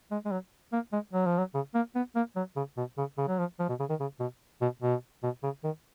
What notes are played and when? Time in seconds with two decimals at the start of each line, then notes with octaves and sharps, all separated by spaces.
0.11 G#3
0.25 G#3
0.31 F#3
0.72 A#3
0.92 G#3
1.13 F#3
1.26 F3
1.38 F#3
1.54 C#3
1.74 A#3
1.95 B3
2.15 A#3
2.36 F#3
2.56 C#3
2.77 B2
2.97 C#3
3.18 C#3
3.28 F#3
3.38 F3
3.59 F3
3.69 B2
3.79 C#3
3.89 D#3
4.00 C#3
4.20 B2
4.61 B2
4.82 B2
5.23 B2
5.43 C#3
5.64 D#3